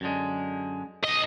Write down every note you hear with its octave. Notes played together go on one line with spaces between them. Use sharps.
F#2 D3 G#3
B1 D#5